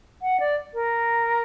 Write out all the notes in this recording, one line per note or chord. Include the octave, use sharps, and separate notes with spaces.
F#5
D5
A#4